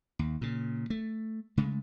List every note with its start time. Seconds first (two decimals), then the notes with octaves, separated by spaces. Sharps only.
0.19 D#2
0.41 A#2 C#3
0.90 A3
1.57 C#3 G#3 A3